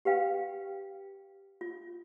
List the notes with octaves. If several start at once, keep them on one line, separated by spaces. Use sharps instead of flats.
G4 B4 F5 G5
F4